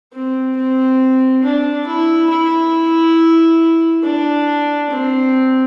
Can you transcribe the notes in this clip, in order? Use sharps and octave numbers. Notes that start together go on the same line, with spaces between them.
C4
C4
D4
E4
E4
D4
C4